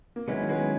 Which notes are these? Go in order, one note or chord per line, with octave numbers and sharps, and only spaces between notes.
A#3
D#3 F#3 G#3 B3 C#4 E4
G#3 B3